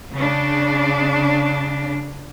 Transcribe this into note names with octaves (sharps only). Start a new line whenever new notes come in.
C#3 D4